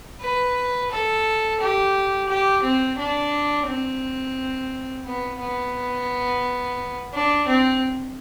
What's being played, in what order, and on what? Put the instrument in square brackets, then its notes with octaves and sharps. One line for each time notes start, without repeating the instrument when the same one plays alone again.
[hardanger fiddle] B4
A4
G4
G4
C4
D4
C4
B3
B3
D4
C4